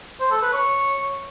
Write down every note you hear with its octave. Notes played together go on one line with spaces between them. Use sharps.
C5
A4
B4
C#5